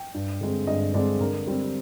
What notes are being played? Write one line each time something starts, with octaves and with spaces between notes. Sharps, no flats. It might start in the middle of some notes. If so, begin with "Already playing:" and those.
Already playing: G5
G2
D3 G#3 C4
G2 D#5
D3 G#3 C4 D5
D3 A#4
G3 C4